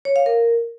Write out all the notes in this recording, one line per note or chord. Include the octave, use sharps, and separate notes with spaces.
C#5
F5
A#4